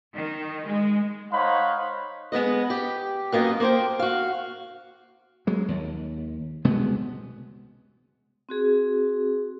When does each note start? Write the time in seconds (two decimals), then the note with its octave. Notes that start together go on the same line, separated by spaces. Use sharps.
0.14 D#3
0.66 G#3
1.32 D#4 C5 C#5 F5 F#5 B5
2.32 G#3 B3 B4 D#5
2.70 G4
3.32 F#2 A#3 B3 D#5
3.60 A#3 C5 G5
3.99 F#4 F5
5.47 F#3 G#3
5.68 D#2
6.65 C2 B2 G#3 B3
8.49 C4 F#4 G#4